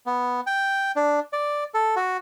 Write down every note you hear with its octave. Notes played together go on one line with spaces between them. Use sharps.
B3
G5
D4
D5
A4
F#4